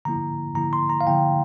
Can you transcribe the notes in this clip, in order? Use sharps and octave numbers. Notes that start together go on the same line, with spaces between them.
D3 F3 A#3 E4 A#5
D3 F3 A#3 E4 A#5
C6
A#5
F5
D3 F3 A#3 E4 G5